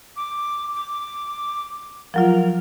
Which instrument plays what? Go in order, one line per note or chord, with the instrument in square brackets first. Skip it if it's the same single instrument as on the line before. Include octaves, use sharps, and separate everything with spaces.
[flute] D6
D6
[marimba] F3 F#3 F4 [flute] A#4